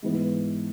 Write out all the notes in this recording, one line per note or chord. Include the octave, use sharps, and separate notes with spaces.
G#2 E3 B3